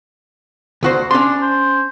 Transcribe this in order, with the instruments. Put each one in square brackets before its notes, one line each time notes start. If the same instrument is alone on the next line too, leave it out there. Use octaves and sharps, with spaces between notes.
[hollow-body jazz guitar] D2 F#4 C5
[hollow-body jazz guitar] C#4 C6 [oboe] D4
[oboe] C5